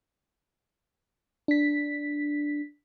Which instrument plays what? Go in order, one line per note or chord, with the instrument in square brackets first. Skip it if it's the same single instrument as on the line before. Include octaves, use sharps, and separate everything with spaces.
[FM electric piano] D4 B6